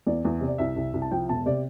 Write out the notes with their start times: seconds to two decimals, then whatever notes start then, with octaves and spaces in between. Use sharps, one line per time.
0.07 E2 D5
0.25 E2
0.41 C3
0.47 D5
0.58 C2 E5
0.76 C2
0.94 C2
1.02 A5
1.11 F3 G5
1.29 E1 A5
1.46 C3 D5